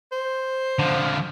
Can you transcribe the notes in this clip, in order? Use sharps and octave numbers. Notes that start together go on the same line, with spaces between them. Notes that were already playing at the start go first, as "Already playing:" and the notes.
C5
D3 F3